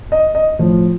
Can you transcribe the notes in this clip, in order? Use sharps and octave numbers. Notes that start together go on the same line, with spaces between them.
D#5
D#5
A2 F3